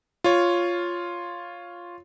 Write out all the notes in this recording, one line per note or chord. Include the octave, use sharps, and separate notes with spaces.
F4 C#5